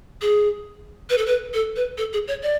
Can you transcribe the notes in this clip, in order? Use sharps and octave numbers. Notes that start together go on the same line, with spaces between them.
G#4
B4
A4
B4
A4
B4
A4
G#4
C#5
D5